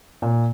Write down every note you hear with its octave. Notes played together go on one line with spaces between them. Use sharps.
A#2